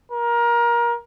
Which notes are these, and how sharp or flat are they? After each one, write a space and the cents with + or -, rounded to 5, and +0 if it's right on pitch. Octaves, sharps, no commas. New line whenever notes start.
A#4 +25